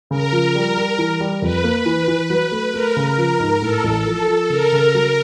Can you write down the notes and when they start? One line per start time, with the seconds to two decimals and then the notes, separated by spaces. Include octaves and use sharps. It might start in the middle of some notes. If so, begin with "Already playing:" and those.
0.10 C#3 A#4
0.32 F3
0.55 G3
0.77 G3
0.98 E3
1.20 G3
1.42 F2 B4
1.64 A#3
1.86 E3
2.08 E3
2.30 F#3
2.52 A3
2.73 A3 A#4
2.97 C#3
3.18 F3 A#4
3.40 G#2
3.61 A2 A4
3.84 A1
4.06 F3
4.28 F3
4.50 C#3 A#4
4.72 C#3
4.94 F#3